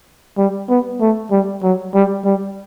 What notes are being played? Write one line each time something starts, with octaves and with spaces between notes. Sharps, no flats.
G3
B3
A3
G3
F#3
G3
G3